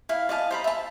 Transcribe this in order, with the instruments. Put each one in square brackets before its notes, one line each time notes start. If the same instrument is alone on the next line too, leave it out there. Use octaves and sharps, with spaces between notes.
[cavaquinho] E4 F5
D5 D#5 F5 A5
C5 A#5 B5
E5 A5